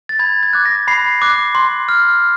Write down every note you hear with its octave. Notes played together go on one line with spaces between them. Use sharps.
A6
B5 G#6
G#6
D6 F#6
A#6
B5 C7
D6 F#6
C6
F6